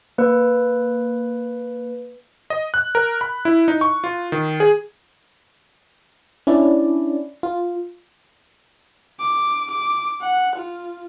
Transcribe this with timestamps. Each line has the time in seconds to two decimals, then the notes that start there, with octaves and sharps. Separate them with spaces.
0.18 A#3 B4
2.50 D#5
2.74 F#6
2.95 A#4
3.21 B5
3.45 E4
3.68 D#4
3.81 C#6
4.04 F4
4.32 D#3
4.60 G#4
6.47 C#4 D4 E4 D5
7.43 F4
9.20 D6
9.70 D6
10.22 F#5
10.56 F4